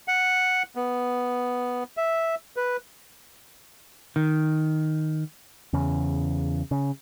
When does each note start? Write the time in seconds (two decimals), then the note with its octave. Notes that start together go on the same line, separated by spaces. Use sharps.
0.08 F#5
0.76 B3
1.97 E5
2.56 B4
4.16 D#3
5.73 E2 C#3
6.71 C#3